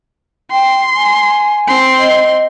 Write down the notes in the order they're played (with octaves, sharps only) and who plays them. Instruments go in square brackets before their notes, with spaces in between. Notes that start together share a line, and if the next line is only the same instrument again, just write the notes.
[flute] G5 [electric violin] C6
[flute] G#5
[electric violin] C4 C6
[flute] D#5